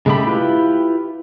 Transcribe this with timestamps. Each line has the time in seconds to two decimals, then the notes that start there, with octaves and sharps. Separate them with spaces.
0.06 C#3 G#3 A3 G4 B5
0.27 E4 F4 G4 B4